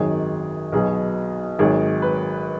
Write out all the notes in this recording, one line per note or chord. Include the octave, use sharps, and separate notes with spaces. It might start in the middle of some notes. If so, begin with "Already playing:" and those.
Already playing: G#1 F#2 D#3 F#3 G#4
B1 B2 F#3 G#4
G#1 G#2 F#3 G#4
B4